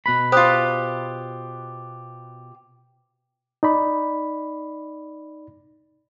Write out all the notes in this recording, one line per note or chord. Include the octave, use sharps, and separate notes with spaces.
B2 B4 B5
F4 G4 C5 D#6 F#6
D#4 D5 B5